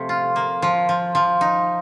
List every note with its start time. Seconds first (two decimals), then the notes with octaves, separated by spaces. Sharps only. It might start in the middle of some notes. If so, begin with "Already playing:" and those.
Already playing: C3 F3 A3
0.09 F4
0.36 A#3
0.62 F3
0.89 F3
1.15 F3
1.41 D#4